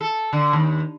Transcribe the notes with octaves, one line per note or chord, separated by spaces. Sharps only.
A4
D3
D#2